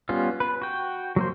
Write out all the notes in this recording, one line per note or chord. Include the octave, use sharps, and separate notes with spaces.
G3 B3 C#4 F4
B4
F#4 G5
F#3 A#3 C5